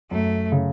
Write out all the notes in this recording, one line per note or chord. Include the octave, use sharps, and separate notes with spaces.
F#2 A3
C#3